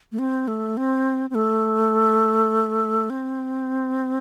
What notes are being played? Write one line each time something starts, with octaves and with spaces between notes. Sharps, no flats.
A3
C4
A3
C4
C4
A3
C4